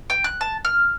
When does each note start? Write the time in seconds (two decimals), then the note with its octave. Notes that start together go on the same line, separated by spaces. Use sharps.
0.10 G5
0.24 F#6
0.41 A5
0.65 F6